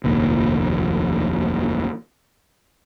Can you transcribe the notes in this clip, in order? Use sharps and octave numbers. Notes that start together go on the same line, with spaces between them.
F1 A#1 D#2